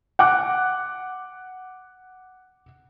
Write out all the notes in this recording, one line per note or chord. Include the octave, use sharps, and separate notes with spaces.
F#5 D6 F#6